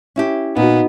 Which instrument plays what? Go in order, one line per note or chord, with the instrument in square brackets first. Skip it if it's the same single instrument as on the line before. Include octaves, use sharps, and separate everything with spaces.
[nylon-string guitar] C#4 E4 G4
[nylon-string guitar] A#2 [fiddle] B3 [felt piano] D#4 F#4